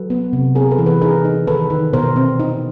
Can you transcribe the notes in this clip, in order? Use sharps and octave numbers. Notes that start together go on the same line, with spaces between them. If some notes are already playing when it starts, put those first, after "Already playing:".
Already playing: F#3 A4 B4
B3
C3
C4 G#4 A#4
A4 B4
E3
A4 B4
D#4 G#4 A#4
D#4
D#3 A4 B4
D#3
B2 A#4 C5
C4
D#4